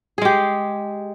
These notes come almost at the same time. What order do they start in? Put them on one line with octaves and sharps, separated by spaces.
G#4 G#3 G4